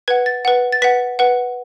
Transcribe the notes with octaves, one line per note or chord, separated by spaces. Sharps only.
B4 F#5 G#6
A6
B4 F#5
A6
B4 F#5 B6
B4 F#5